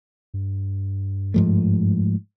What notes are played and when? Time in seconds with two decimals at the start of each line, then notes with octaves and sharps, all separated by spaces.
0.34 G2
1.34 G#2 F3 A3